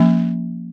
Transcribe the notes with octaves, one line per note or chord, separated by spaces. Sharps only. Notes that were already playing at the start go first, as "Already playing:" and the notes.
Already playing: F3 A#3 C#4